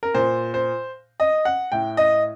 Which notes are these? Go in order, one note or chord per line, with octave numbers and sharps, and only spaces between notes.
A#4
A#2 C5
C5
D#5
F#5
A2 G5
D#5